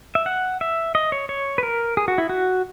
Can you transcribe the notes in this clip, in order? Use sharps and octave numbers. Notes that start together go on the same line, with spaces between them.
E5
F#5
E5
D#5
C#5
C#5
B4
A#4
G#4
F#4
E4
F#4